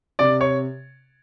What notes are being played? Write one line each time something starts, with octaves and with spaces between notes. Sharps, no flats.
C3 D5 D6
C#5 C#6